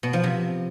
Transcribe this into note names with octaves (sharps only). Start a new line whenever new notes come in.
B2
F3
C3